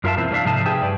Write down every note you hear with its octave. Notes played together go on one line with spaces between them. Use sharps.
F#2 F4 A#4 E5 F5 A5
B2 E3 C4 E4
G#3 A#3 D4 E5 F5
G#2 C3 F3 A3 D#4 A5
G4 G#4 B4 E5 G5 A5
G2 B4 D5